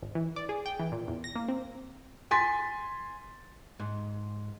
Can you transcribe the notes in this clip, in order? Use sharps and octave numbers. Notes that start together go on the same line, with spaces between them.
G#1
E3
D5
G#4
G5
E3
A#2
E2
A#6
A#3
C4
G#5 C6 A6 B6
G#2